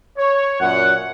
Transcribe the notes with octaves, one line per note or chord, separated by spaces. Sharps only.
C#5
F#2 A#2 F#5